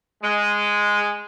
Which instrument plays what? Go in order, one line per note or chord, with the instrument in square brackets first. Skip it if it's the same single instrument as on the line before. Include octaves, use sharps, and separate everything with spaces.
[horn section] G#3